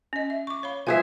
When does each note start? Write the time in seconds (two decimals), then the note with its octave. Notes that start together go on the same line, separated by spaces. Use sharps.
0.13 C#4 D#5
0.30 E5
0.47 C#6 D6
0.63 C#5 F5 B5
0.87 F3 G3 G#4 B4 E5 G#5